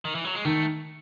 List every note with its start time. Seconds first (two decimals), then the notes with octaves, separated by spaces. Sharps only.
0.05 D#3
0.15 E3
0.25 F#3
0.35 G#3
0.45 D#3 A3